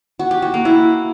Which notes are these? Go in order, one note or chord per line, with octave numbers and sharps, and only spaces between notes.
F#4
G4
F#4
A#3
E4